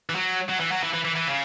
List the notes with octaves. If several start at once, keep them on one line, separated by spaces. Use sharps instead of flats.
E3
F#3
F#3
E3
F#3
E3
E3
E3
E3
C#3